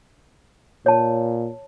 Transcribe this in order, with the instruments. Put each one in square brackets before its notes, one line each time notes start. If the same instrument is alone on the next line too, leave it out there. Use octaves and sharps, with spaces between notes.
[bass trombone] A#2 [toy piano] C#5 A5